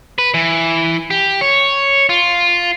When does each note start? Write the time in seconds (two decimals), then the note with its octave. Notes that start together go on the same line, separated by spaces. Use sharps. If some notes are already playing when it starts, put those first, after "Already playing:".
0.18 B4
0.34 E3
1.11 G4
1.41 C#5
2.09 F4